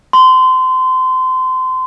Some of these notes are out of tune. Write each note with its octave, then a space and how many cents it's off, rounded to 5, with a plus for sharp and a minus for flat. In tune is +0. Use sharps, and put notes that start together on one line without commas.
C6 -25